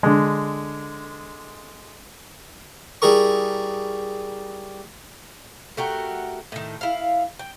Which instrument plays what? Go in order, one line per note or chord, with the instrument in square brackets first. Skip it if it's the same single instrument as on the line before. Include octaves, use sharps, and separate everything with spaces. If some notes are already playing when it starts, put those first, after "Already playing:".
[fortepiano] D3 G#3
[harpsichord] G3 E4 G#4 A#4 C#6
[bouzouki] A3 F#4 G4 A#4
A2 D#3
E4 F5
G5